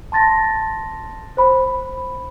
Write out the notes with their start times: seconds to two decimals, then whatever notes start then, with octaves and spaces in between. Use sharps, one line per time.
0.12 A5 C6 A6 A#6
1.37 C5 B5